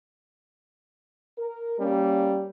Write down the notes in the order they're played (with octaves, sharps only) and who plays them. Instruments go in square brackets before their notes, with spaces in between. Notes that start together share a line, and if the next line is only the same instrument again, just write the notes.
[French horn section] A#4
[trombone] G3 [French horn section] A#3 C#4